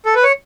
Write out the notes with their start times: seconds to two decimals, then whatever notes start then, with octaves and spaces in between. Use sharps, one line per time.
0.06 A4
0.15 B4
0.23 C#5